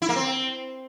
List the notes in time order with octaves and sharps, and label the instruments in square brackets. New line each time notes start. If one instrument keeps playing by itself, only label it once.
[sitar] E4
A#3
C4